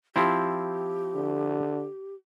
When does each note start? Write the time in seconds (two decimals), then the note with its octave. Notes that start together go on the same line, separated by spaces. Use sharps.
0.16 F3 C4 E4 G4
1.14 D3